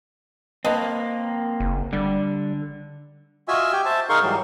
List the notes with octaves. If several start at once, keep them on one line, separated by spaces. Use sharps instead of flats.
A#3 C4 B4 D#5 A5
F#1
D3 G3
F4 F#4 D#5 E5 G#5 E6
G4 G5 G#5
C5 E5 A5
D#4 G#4 A#4 F5 C6 C#6
G#2 E3 F#3 G3